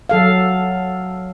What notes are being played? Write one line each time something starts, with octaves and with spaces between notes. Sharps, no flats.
F#3 A4 F5